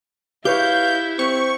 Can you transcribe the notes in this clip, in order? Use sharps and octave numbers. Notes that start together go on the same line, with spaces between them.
E4 G4 B4 C#5 F5 G6
C4 C#6